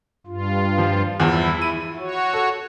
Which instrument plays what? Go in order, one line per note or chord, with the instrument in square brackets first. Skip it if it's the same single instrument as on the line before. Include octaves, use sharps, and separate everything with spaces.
[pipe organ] G2 F4
[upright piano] F3
[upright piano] E2 F3 [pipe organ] E4
[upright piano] D#7
[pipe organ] F#4 C#5
[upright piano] A4